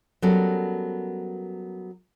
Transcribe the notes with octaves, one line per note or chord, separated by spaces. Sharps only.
F#3 G3 B3 C#4 A4 A#4